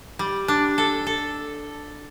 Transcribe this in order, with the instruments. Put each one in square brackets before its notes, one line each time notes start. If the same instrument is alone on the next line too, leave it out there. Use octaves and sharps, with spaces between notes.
[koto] G3
D4
A4
A4